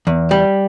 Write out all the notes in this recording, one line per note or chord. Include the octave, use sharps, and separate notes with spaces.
E2
G3